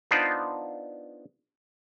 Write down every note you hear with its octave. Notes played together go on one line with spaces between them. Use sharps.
B3 D4 D#4 F4 C5 D5